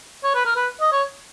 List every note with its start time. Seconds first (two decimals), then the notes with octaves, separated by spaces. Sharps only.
0.23 C#5
0.34 B4
0.45 A#4
0.56 B4
0.81 D#5
0.92 C#5